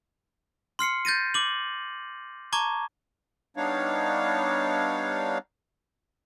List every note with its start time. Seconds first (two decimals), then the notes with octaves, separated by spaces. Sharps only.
0.79 C6 F6 C7 C#7
1.05 G6 A6 A#6 D#7
1.34 D6 F#7
2.53 A5 A#5 C#6 D6 G#6
3.57 G3 B3 D4 D#4 C#5 F5